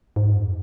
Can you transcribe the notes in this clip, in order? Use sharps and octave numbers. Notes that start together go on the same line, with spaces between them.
G#2
F2